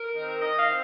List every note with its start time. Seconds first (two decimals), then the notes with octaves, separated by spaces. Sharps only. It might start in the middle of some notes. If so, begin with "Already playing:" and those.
Already playing: A#4
0.12 D#3 C4 D#4
0.39 D#3 D#5
0.59 F5
0.68 C4